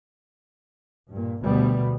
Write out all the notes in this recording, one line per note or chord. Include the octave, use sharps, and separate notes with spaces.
G2 A#2
D2 B2 G3 B3